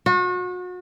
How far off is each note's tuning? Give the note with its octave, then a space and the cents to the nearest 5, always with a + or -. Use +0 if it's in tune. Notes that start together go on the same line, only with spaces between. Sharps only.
F#4 -35